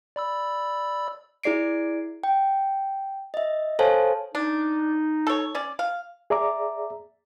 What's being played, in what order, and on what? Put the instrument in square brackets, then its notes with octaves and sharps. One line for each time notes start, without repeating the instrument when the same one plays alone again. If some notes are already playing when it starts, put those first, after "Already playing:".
[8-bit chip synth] D5 B5 E6
[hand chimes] E4 G#4 D5 C7 D7
G5
D#5 E5
A4 C5 C#5 F5 G#5 A5
[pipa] D4 [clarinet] D#4
[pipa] A4 C#5
C#4 D5
F5
[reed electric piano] G#4 D5 E5 A#5 D6